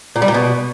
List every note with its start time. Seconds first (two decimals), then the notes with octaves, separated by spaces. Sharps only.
0.16 A#2
0.22 G3
0.28 A#2
0.34 B2